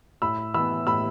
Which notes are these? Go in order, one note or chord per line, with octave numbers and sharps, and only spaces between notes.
A2 B5 E6
E3 B3 B5 E6
A2 B5 E6